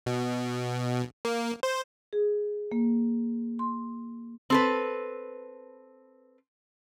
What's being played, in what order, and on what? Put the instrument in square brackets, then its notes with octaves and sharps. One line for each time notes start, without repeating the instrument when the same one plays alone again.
[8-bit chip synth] B2
A#3
C5
[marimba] G#4
A#3
C6
[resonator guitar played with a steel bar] C4 A4 B4